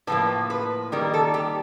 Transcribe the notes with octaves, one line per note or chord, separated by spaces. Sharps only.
A2 F3 A#3 B4
B4
D#3 G3 A#3 A#4
A4
G4